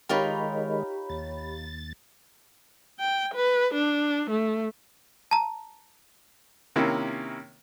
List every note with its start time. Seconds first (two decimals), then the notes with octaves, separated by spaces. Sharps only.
0.09 D#3 G#3 D#4 F4 G4 A#4 C#5 B5
1.09 D#2 A6
2.99 G5
3.34 B4
3.74 D4
4.30 A3
5.31 A5 A#5
6.76 C3 D#3 A#3 C#4 E4